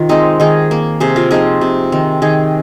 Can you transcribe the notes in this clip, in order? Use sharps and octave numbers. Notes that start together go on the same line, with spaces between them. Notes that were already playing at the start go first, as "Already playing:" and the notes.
Already playing: C3 D#3 F4
G#3 C4 D#4
D#3 D#4 G#4
A#3
C3 G#4 C5
F4 A#4
F3 C4 D#4 G#4
C3
D#3 C4
D#3 D#4 G#4